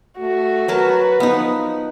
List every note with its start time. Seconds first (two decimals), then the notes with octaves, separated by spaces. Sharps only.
0.19 A3 F#4
0.68 F#3 A#4 B4 A5
1.20 F3 B3 D#4